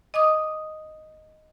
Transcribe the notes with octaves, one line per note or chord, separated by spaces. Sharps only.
D#5 D6 D#6